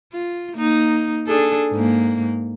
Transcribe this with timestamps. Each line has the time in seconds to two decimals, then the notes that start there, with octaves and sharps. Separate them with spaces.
0.13 F4
0.55 A#3 D#4
1.27 D4 G#4 A4
1.73 G#2 A#3